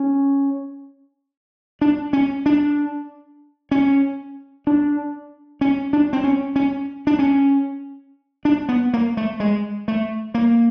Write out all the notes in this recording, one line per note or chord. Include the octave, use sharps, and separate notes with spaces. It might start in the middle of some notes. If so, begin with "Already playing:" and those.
Already playing: C#4
D4
C#4
D4
C#4
D4
C#4
D4
C4
C#4
C#4
D4
C#4
D4
B3
A#3
A3
G#3
A3
A#3